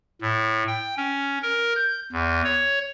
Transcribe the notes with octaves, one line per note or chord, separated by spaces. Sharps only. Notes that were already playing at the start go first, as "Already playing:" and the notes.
A2
G5
C#4
A#4
G6
E2
C#5